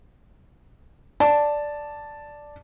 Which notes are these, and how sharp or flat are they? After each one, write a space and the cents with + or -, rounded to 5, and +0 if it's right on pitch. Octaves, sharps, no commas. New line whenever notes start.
D5 +0 A5 +0